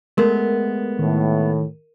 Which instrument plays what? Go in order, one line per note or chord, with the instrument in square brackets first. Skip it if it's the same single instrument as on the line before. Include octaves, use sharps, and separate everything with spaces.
[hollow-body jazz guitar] G#3 A3 B3 [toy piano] A#4
[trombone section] A2 [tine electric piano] D#3